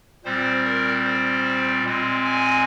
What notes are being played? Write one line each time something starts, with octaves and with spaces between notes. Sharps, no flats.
A#2 G3 C4 C5
A#4
C5
A#2 G#3 C4
G#5